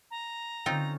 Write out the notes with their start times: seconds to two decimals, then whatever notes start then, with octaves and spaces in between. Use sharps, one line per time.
0.11 A#5
0.66 D3 C4 C#4 D#4 F4